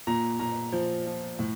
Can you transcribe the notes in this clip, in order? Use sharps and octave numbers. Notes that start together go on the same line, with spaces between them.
A#2 A#5
A#2 A#5
F3
F3
A2